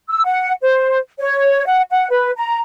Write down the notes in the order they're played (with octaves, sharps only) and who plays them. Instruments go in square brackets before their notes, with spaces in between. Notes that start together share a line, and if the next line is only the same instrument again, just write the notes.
[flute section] E6
F#5
C5
C#5
F#5
F#5
B4
A#5